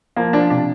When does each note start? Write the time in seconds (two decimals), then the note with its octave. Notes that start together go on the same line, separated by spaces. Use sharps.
0.16 F3 A#3
0.33 F3 D4
0.50 C3 D4